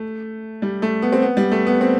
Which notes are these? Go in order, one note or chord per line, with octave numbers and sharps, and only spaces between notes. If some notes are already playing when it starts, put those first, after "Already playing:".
Already playing: A3
G3
A3
B3
C4
B3
G3
A3
B3
C4